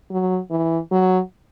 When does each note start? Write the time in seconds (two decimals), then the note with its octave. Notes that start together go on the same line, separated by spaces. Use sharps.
0.11 F#3
0.51 E3
0.91 F#3